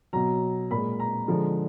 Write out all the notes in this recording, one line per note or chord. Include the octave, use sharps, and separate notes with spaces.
B2 F#3 A#5
A#2 G#3 B5
A#5
D3 F3 G#3